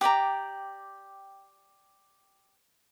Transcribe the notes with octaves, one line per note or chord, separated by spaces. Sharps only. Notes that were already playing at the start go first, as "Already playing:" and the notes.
G4 D5 G5 A#5